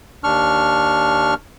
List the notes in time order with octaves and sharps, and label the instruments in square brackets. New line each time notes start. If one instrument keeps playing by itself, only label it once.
[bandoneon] D#2 D4 C#6 F6